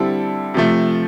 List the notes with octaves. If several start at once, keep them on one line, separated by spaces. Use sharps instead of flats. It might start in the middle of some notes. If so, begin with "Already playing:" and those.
Already playing: D3 G3 C4 E4 A4
C3 F3 A3